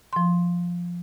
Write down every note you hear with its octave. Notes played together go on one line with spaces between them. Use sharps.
F3 C6